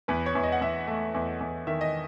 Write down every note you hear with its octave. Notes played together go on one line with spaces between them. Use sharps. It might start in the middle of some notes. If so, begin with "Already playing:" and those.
E2 B4
C#5
E2
D#5
F#5
E2 E5
A3
E2
E2
D#3 E5
D#5